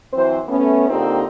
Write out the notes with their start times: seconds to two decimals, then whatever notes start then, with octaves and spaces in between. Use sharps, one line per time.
0.13 E3 F#3 C4 C5
0.48 A3 B3 C#4
0.89 D3 A#3 C4 D#4 F4 G4